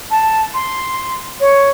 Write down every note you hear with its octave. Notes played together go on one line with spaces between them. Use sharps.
A5
C6
C#5